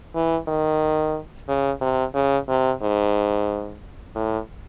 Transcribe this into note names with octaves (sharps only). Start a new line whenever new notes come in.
E3
D#3
C#3
C3
C#3
C3
G#2
A2